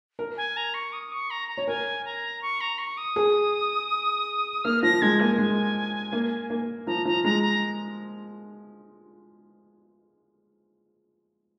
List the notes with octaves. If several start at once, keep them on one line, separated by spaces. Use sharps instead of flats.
A#4
G#5
A#5
C#6
D#6
C#6
A#5
A#5
C#5
A#4 G#5
A#5
C#6
A#5
C#6
D#6
G#4
A#3 F6
F3 A#6
G#3 G#6
A#3 G#5
G#3
A#3
A#3
F3 A#5
F3 A#5
G#3 A#5
A#5